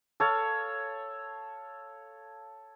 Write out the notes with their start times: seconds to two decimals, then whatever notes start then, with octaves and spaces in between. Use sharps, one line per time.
0.20 A4 C#5 F5